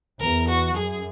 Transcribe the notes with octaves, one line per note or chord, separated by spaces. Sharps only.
E2 A#4
F#4
F#2 G#4